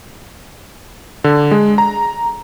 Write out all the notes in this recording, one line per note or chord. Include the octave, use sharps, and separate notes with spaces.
D3
G#3
A#5